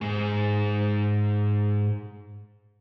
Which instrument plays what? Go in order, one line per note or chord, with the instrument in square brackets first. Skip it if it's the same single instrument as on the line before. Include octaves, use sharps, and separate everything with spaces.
[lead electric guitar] G#2 G#4